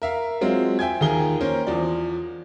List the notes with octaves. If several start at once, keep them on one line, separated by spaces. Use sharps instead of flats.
A#4 E5 F5
F#3 G#3 C4 F4
E5 G5 G#5 G#6
D#2 F3 G#4 A#4 G7
A#3 C#4 A#4 C5
E2 F3 D5